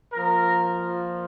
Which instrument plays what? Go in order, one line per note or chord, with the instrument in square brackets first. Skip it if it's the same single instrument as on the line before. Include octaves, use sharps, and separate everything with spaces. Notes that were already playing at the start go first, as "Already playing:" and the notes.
[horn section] A#2 F3 A#4